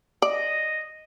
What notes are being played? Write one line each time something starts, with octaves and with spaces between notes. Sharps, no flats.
D5 D#5